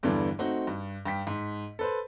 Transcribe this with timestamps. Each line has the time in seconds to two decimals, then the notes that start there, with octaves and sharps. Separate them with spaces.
0.03 E2 G2 D3 E3 G3 D4
0.39 A3 C4 D#4 F#4
0.67 G2
1.06 G2 G5 B6
1.27 G#2
1.79 A4 B4 C5